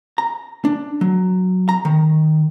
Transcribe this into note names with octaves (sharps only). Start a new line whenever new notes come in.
A#5
D4
F#3
A#5
D#3